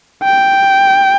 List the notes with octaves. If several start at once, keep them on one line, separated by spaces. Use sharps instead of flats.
G5